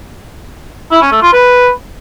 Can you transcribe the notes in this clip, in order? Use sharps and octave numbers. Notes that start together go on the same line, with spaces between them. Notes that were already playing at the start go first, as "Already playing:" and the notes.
E4
C#4
A3
F4
B4